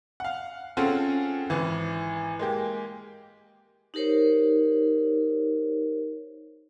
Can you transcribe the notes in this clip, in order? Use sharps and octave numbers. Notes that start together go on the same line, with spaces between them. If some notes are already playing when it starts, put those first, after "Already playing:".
F5 F#5
C4 C#4 F4 G#4 A4 F#5
G#1 E3
G#3 A#3 G4
D#4 G4 A#4 C5 C#5